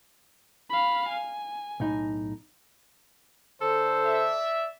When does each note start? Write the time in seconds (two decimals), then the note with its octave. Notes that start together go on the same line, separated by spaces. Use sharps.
0.70 F5 B5
1.09 G#5
1.80 B1 A2 D#4
3.62 D3 A4 C5
4.06 D5 E5